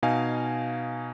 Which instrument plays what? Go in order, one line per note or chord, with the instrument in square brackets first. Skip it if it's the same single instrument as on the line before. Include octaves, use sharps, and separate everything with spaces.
[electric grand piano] B2 D#4 F5 G#5